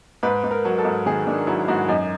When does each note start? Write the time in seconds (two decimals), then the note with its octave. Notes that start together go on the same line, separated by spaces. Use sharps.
0.23 G#2 B4
0.44 G#2
0.51 A#4
0.65 F#3
0.78 A4
0.85 G#2
1.06 D#3 G#4
1.27 D#3 D4
1.47 F#3 E4
1.68 G#2 F#4
1.89 F#2 D#4